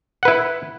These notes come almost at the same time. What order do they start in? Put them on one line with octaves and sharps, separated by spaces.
F#5 B4 E4